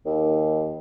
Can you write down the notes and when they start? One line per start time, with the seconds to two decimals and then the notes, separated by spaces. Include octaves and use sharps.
0.06 D#2